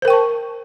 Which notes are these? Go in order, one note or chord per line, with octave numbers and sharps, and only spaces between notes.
A#4 C5 G5 A5 C#6